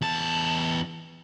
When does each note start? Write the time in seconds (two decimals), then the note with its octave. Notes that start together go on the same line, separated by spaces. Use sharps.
0.01 E2 A5